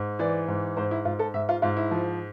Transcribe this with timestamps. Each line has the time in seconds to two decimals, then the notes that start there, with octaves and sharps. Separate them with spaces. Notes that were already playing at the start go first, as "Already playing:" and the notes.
Already playing: G#2
0.19 E3 D5
0.48 G#2
0.77 G#2 C5
0.91 E4
1.05 G#2 F4
1.19 A4
1.34 G#2 E5
1.49 F4
1.62 G#2 F4
1.77 E4
1.91 F3